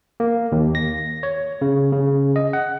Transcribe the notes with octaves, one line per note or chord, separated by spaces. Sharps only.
A#3
D#2
A#6
C#5
C#3
C#3
D#5
F#5